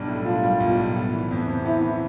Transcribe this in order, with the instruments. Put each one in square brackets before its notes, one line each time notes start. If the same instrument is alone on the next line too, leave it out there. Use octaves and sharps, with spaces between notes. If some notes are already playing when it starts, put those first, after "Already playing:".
Already playing: [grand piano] B1 G3 D4
A2
[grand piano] D4 [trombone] F4
[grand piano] G3
B1
A2
B3
E3
F2
C3
[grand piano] B3 [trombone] E4
[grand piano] E3